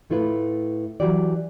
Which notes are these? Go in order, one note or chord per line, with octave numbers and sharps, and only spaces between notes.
A2 A3 E4 F4 B4
E3 F#3 F#4 G4 D5